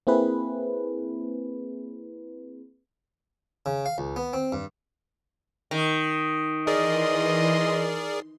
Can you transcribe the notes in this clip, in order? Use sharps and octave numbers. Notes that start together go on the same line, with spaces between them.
A#3 C4 E4 G#4 B4
C#3
F5
C#2
B3
C4
G2
D#3
E3 G#4 A#4 D5 D#5 C6